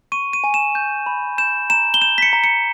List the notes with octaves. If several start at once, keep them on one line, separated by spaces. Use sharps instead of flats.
C#6 D#7
D#7
G#5
E7
G6
B5
G6 E7
A#5 E7
G7
G6 E7
B6
C#7
A#5
C#7